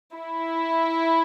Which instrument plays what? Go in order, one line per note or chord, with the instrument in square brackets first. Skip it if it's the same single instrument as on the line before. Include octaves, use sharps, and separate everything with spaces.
[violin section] E4